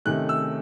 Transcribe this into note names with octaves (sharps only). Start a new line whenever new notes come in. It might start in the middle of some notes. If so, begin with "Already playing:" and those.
C3 D#3 A3 C#4 F#6
E6